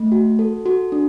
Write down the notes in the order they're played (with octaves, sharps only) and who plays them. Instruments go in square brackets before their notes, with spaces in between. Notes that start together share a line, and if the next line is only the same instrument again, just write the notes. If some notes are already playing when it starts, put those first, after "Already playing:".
Already playing: [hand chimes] A3
F#4
A4
F#4
D4